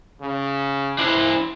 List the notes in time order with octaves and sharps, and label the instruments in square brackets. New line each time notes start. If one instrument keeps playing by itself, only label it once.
[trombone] C#3
[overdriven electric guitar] D4 C5 [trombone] E4